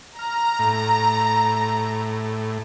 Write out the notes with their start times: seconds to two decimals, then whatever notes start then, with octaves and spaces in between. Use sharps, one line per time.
0.19 A#5 F6
0.59 A2